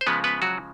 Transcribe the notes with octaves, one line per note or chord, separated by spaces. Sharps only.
C5
C#3 F3 G#3 B3 B4
B3 B4
F#3 F#4